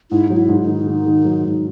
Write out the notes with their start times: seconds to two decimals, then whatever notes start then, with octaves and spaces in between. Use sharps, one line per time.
0.11 G#2 E4
0.28 F#3 D#4
0.36 E4
0.49 G#2
0.62 D#4
0.67 D#3
0.87 D#3
1.06 D#3
1.25 F#3
1.45 G#2